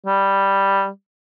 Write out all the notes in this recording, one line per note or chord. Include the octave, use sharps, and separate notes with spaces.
G3